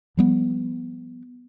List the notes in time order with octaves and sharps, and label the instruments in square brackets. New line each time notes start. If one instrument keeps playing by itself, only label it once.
[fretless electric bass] F3 G3 B3